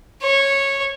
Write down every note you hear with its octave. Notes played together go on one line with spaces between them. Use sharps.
C#5